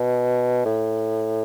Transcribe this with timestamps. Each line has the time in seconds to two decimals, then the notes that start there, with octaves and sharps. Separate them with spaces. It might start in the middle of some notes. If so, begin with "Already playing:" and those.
Already playing: B2
0.65 A2